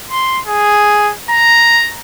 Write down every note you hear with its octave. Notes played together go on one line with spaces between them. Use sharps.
C6
G#4
A#5